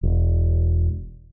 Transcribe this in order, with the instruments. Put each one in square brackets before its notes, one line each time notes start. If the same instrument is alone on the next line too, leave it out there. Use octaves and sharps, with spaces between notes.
[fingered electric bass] E1